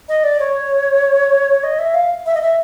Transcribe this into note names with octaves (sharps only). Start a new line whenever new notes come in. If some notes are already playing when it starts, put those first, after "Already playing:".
D#5
D5
C#5
D#5
E5
F5
E5
D#5
E5